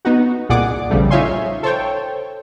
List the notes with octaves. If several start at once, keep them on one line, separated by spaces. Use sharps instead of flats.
B3 D#4 F#4
C2 A#2 G#4 D5 F#5 D6
A#1 C#3 F3 G3 A3
D#4 F4 C#5 E5 G#5 C6
A4 C5 C#5 G5